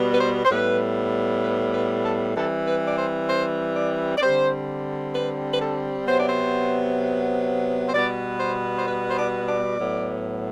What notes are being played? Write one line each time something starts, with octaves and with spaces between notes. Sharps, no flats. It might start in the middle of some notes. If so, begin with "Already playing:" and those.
Already playing: B2 G3 B3
B4
C5
C5
A2 G3 B3 B4
B4
B4
A4
E3 G3 C4 A4
B4
D5
C5
C5
D5
D5
D3 G3 C4 C5
B4
B4
A4
C3 F#3 B3 C5
D5
C5
C5
B2 G3 B3 D5
C5
C5
B4
C5
D5
D5
A2 F#3 B3